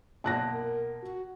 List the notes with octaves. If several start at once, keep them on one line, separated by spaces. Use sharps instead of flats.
B1 F#2 A#2 A5 F#6 A#6
A#4
F#4